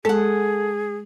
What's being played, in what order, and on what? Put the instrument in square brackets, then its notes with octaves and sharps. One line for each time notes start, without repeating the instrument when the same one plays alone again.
[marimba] G#3 [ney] G#4 [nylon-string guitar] A4 F#5